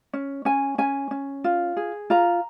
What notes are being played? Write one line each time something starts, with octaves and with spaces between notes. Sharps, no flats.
C#4
C#4 G#5
C#4 G#5
C#4
F4
G#4
F4 A#5